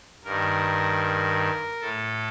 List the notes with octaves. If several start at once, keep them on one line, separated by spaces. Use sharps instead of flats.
G2 D#3 A#4
A2 A4